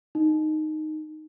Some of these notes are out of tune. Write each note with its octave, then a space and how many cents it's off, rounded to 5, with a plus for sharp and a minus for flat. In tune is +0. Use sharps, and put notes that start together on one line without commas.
D#4 -5